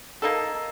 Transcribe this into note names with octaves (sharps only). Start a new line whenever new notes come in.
A#3 D#4 A4